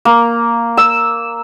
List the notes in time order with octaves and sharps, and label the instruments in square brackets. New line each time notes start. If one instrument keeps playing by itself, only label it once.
[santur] A#3
E6